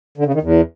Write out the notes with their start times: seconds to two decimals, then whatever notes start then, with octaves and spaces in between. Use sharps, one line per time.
0.18 D3
0.26 C#3
0.34 D#3
0.42 E2